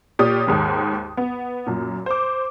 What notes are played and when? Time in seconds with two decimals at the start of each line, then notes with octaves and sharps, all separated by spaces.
0.19 A#2 G4 C#5 D5 D#6
0.47 D#2 G#2 D#3
1.17 B3
1.67 F#2 A#2
2.06 C5 D6